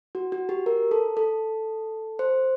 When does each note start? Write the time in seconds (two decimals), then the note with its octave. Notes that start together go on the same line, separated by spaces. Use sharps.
0.15 F#4
0.32 F#4
0.49 G4
0.66 A#4
0.91 A4
1.17 A4
2.19 C5